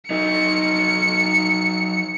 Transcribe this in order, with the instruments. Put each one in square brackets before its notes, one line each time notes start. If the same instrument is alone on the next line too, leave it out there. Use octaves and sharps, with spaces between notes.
[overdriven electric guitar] F#3 D#4 [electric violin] C#7